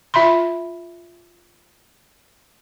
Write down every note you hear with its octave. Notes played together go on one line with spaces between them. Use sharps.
F4 E5 B5 C6